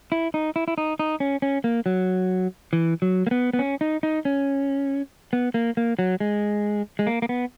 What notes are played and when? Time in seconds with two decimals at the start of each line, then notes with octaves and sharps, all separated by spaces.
0.12 E4
0.34 D#4
0.56 E4
0.68 E4
0.78 D#4
0.99 D#4
1.20 C#4
1.42 C#4
1.64 A#3
1.86 F#3
2.73 E3
3.02 F#3
3.27 A#3
3.31 B3
3.53 B3
3.59 C#4
3.81 D#4
4.03 D#4
4.25 C#4
5.33 B3
5.54 A#3
5.77 A#3
5.99 F#3
6.20 G#3
6.99 G#3
7.07 A#3
7.22 A#3
7.29 B3